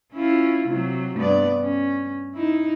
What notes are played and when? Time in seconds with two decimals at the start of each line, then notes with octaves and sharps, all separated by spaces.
0.13 C#4 E4 F4
0.67 C3 F#3
1.16 G2 B3 D5
1.60 C#4
2.35 D#4 E4